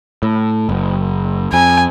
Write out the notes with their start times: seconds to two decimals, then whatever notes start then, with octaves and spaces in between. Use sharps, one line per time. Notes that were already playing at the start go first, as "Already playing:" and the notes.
0.23 A2
0.69 F#1
1.53 F2 G#5